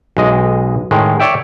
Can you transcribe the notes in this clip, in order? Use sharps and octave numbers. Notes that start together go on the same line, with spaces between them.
B1 G#3 D#5
A2 D#3 G#3
C#5 D5 E5 G5